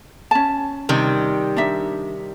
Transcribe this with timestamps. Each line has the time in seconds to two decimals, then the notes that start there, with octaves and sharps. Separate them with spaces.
0.31 C#4 A5
0.89 C3 D#3 G3
1.56 D4 D#4 E5